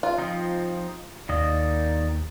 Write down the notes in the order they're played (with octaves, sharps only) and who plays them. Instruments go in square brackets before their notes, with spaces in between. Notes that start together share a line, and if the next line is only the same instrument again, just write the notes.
[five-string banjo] F4
[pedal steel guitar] F3 C4 D#4
[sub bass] D#2 [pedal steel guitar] D#3 A#3 D#5 [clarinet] D5